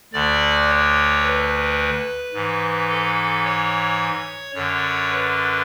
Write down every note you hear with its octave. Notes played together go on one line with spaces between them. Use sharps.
D2 D3 D5
C#5
B4
G#2 E3
A4
C#5
F#2 D3 C#5
B4